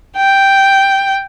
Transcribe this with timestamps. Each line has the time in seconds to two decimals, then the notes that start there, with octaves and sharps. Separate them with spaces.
0.17 G5